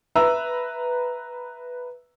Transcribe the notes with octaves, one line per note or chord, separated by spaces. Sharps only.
B4 E5 A#5 E6